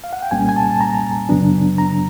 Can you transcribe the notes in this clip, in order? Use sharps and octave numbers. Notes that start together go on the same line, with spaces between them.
F5
F#5
G5
C2 A#2 G3 A#3 C#4 G#5
G#5
A5
A5
A#5
F#2 C#3 F#3 B3 D4
A#5